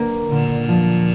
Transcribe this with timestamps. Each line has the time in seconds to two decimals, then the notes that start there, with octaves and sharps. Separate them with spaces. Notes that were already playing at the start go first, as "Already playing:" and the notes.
Already playing: D3 A#3
0.31 A#2 D3
0.69 F3